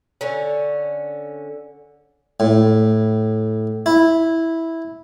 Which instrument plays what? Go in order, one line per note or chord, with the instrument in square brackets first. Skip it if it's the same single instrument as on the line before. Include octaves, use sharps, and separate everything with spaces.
[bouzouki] D3 C#4
[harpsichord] A2
E4